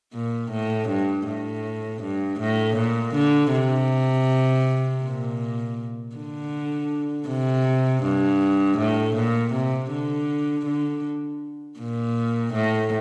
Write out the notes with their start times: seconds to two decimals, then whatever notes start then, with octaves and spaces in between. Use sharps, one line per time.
0.14 A#2
0.52 A2
0.89 G2
1.27 A2
2.03 G2
2.40 A2
2.77 A#2
3.15 D3
3.52 C3
5.03 A#2
6.16 D3
7.28 C3
8.04 G2
8.78 A2
9.17 A#2
9.53 C3
9.91 D3
10.66 D3
11.79 A#2
12.54 A2